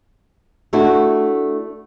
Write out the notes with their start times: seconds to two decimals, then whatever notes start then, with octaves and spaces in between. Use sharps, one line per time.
0.73 A3 D4 E4 F#4